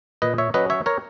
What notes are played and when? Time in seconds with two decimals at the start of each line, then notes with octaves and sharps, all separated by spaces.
0.22 A#2 B4 D#5
0.38 C#5 E5
0.54 F#3 C#4 B4 D#5
0.70 C#5 E5
0.86 A#4 C#5